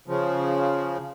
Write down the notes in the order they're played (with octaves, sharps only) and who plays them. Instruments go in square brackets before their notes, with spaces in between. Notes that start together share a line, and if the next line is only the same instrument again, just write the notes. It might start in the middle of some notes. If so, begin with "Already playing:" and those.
[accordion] C#3 F3